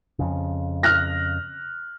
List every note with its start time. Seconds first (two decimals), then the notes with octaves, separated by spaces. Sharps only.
0.19 F2 C#3
0.83 F6 F#6 A#6